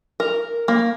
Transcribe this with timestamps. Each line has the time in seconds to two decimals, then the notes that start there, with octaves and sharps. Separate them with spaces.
0.20 A#4
0.68 A#3